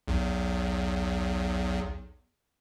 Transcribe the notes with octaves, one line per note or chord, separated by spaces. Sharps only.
B1 E2